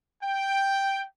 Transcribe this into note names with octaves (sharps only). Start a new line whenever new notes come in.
G5